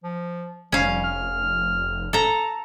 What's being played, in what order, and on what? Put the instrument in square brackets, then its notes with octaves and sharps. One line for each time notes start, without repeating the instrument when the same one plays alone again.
[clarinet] F3
[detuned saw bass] F1 [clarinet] G3 [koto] C#4 F5
[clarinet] F6
[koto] A4 A#5